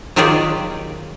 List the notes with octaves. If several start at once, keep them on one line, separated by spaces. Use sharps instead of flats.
D#3 F#3 F4 G4 G#4 D5